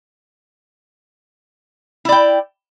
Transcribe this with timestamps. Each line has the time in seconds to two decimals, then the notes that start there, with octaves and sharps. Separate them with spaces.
2.05 E4
2.09 D5
2.12 G5